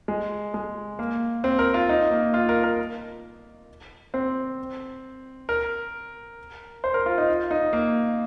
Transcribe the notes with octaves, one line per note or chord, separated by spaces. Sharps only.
G#3
G#3
A#3
C4
A#4
F4
D#4
A#3
F4
A#4
A#4
C4
A#4
C5
A#4
F4
D#4
F4
D#4
A#3